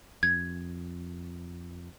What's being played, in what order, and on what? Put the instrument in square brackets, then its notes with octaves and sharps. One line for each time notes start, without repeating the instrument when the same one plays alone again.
[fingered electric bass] F2 [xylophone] G#6